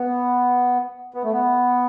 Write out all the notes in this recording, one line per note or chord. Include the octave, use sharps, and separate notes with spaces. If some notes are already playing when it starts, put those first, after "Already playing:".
Already playing: B3
B3
A3
B3